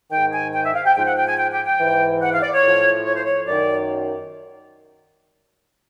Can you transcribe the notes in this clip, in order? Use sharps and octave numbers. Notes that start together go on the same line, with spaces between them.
G#2 D#3 G5
G#5
G5
E5
F5
G5
G#2 F3 G5
F#5
G5
G#5
G5
G5
G5
G#2 E3
F#5
F5
D5
C#5
A2 F3
C#5
C5
C#5
F#2 D#3 D5